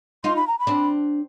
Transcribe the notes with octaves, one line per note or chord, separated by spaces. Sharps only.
D#4 F4 C6
B5
A#5
B5
C4 D4